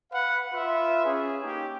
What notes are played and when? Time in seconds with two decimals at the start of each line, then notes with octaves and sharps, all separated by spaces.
0.12 B4 F5 F#5
0.53 F4 B4 E5
1.05 C#4 G#4
1.43 A#3 D#4 G4